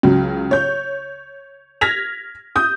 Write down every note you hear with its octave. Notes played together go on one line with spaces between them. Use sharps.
C#2 C#3 F#3
C#5 G6
F6 G#6 A#6 B6 F7
D#6 G6